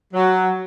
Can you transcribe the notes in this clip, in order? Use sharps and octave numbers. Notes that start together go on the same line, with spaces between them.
F#3